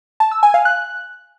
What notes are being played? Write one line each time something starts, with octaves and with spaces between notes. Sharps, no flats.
A5
E6
G#5
F5
F#6